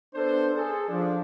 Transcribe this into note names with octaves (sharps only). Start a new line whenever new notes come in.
B3 D4 A4 C5
G#4 A4
F3 D4